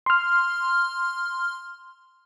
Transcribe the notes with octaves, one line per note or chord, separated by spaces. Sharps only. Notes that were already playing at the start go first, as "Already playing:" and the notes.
C6 F6